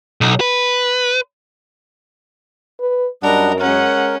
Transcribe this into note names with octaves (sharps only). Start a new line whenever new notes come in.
B1
B4
B4
F#2 G3 D4 A#4 D#5 F#5
G#3 C#4 A#4 F#5